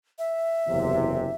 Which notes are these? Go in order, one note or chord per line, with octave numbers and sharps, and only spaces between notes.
E5
F#1 E2 C3